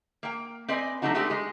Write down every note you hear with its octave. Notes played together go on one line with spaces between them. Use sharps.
A#3 G5
C4 B4 D5 D#5 G#5
F#3 G3 A3 D4 D#4 F#4
G#3 A3 B3 D4 F#4 G4
G#3 G#4